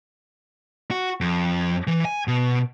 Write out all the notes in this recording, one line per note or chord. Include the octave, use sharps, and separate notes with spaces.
F#4
F2
E3
G#5
B2